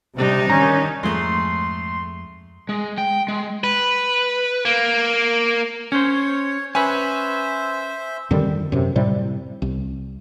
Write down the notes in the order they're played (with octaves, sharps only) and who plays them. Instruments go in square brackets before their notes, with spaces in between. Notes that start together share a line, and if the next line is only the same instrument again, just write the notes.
[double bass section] C3 G3 [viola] D4 D#4
[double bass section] D#3 [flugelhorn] C#4 [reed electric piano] A#5
[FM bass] F2 [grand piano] G#2 A3 [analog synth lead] C6
[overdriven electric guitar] G#3
G5
G#3
B4
A#3
[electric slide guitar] C#4 C5 [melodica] C#5
[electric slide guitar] C#4 B4 [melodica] C5 E5 [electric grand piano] G#5
[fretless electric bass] F2 D3 D#3 G3
F#2 C3
A2 C3 G3
C2